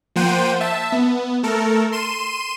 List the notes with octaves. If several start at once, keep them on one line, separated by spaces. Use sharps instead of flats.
F3 A#3 C5 F#5 G5 D#7
E5 A5
B3
A3 A4 A#4
C6 D#7 E7